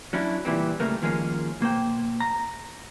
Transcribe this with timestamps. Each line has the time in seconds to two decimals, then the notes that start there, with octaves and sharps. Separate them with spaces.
0.13 F#3 C#4 D4 E4
0.45 C#2 A#2 E3 G3 C4
0.80 C#2 C#3 G3 A3 A#3
1.02 D#2 F3 G#3 A#3 C#4
1.61 B2 A#3 C5 G5
2.20 A#5